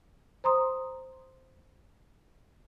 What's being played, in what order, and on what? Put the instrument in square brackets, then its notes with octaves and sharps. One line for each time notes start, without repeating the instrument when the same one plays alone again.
[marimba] C5 A#5 C6 D#6